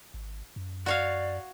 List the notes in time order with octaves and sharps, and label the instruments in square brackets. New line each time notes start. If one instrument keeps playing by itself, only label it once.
[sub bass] G#1
F#2
[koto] F#4 C#5 F5 [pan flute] D5